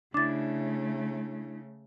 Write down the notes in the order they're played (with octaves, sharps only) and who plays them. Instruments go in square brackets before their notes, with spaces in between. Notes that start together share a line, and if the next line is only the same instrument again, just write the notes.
[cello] C#3 A3 [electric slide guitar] D4 E4 [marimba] D6 A6